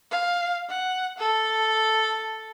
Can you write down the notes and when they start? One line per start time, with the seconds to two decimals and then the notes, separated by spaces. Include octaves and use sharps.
0.11 F5
0.69 F#5
1.18 A4